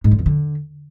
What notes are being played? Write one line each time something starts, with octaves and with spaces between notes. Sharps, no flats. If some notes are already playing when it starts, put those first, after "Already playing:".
G#2
D3
E2
D3